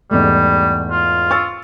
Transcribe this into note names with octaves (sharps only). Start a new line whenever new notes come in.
E2 G#2 G3 A3
F4
C#6 E6 A6